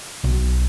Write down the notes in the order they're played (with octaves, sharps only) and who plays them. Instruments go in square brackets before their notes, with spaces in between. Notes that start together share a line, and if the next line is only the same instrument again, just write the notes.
[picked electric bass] B1